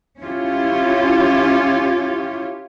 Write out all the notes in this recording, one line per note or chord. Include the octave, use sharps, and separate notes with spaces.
C#4 E4 F4 G4 C#5